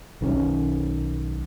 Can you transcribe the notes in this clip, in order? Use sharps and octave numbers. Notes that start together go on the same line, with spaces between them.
B1 D#3 G3 C#4